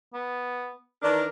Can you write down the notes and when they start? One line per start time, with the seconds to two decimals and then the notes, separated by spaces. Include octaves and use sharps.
0.14 B3
1.02 D#3 E3 D4 A#4